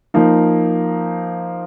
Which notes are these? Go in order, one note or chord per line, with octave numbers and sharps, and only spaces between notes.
F3 A#3 D#4